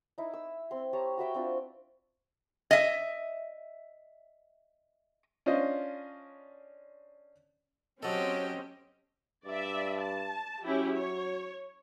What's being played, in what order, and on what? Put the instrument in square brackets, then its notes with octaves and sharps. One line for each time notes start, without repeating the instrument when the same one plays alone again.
[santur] D#4 E4
E6
C4 C6
G4 C#5 A5 A#5
F#4 B4 E5 G5
C4 D4 F4
[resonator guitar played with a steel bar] D#5 E5
[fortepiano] C#4 D4 F4 C5 D#5
[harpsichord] F#3 A4 [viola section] C4 C#4 [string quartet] G4 D#5
[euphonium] G2 [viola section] D5 E5
[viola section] A5
[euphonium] F#3 [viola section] C#4 E4 G4
[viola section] C#5